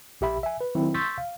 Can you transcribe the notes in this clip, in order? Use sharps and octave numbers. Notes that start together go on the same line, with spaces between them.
A#1 G4 E5 B5
E5 G#5
B4
D#3 F#3 C4 E4
C6 C#6 E6 G6 A6 B6
F5